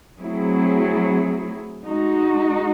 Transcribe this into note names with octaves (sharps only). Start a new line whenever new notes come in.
F#3 A3 C4 E4 G#4
G#3 D#4 F#4